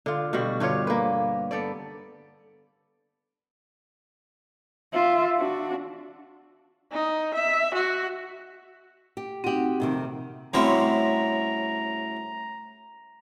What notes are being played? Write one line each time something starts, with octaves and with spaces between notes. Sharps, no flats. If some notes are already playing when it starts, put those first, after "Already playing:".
D3 F4
B2 G3 F#4
G2 D3 F4 C#5
A#3 B4
B3 A4 D5
F4 E5
D4 F#4
D#4
E5
F#4
G4
C4 D#4 F#4 G4
F2 C3 D#3
A2 C#3 G3 C4 F#4 C#5 A#5